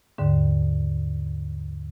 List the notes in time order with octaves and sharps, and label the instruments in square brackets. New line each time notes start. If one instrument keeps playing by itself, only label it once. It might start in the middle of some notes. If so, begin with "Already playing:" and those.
[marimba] D#2 G#2 D3